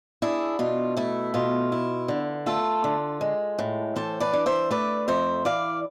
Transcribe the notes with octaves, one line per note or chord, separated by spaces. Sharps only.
D4 E4 G#4
B2 F4
A3 E4
B2 F4
E4
D3
A3 F4 A4
D3
G#3
A2
E3 A4 C5
B4 D5
D4
C5 E5
A3 B4 D5
F2 C5 E5
E3 D5 F5